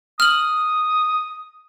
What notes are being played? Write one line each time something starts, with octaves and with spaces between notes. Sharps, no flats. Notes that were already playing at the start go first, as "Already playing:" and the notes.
D#6 F6 F#7